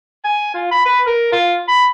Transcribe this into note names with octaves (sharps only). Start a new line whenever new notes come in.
G#5
F4
B5
B4
A#4
F4
B5